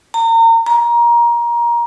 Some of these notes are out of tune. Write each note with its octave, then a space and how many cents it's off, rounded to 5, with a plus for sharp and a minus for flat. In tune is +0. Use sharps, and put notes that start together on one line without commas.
A#5 -35
A#5 +20